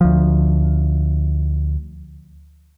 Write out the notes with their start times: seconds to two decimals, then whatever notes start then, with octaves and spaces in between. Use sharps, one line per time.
0.01 D2 F3